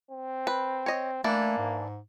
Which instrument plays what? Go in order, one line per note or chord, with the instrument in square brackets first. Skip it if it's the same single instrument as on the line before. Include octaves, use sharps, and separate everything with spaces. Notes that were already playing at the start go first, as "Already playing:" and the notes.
[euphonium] C4
[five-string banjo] B4
C#5 D#5
[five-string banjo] E3 D4 E4 [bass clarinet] A3 [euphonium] A#3
[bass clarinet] G#2